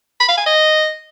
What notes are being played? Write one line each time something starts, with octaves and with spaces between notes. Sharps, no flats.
B5
F5
G#5
D#5